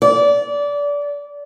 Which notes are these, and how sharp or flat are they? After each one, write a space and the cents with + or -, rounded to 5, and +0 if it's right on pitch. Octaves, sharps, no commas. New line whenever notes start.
D5 -25